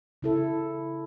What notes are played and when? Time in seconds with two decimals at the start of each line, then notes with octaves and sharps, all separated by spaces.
0.22 C#3 E4 A4